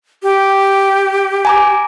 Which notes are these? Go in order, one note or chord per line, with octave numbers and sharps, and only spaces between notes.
G4
G#5 A#5 D6